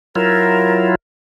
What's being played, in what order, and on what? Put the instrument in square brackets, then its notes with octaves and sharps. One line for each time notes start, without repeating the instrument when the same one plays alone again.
[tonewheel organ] F#3 E4 F4 [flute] A#4